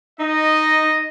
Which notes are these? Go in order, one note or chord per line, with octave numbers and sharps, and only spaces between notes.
D#4 D#5